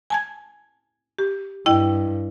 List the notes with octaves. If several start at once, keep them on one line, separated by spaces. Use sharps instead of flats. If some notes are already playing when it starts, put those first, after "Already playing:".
G#5 A5 G#6
G4
G2 E4 D#5 G5